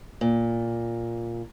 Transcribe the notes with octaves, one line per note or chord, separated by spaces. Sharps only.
A#2